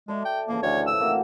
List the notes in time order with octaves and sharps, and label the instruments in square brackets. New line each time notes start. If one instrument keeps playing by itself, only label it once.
[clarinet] G#3 [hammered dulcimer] A4 D5 E5
[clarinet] G5
[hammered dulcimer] C#3 E3 F3 [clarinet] A#3
[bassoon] D2 [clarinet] C#5
[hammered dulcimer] A2 [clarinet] E6
[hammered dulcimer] C3 F#4 G4 [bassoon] A#3